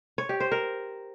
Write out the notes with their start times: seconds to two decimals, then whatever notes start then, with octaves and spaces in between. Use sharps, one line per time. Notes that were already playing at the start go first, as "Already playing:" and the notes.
0.18 C#5
0.29 G4
0.40 C5
0.52 A#4